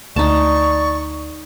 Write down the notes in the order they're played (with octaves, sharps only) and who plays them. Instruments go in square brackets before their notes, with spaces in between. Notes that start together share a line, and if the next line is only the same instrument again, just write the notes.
[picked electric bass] D2 [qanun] D#4 A5 [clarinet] D5 [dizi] C#6